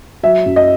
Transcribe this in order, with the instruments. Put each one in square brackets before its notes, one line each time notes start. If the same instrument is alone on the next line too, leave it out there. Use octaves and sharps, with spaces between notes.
[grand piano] F#3 E5
F#2
D#5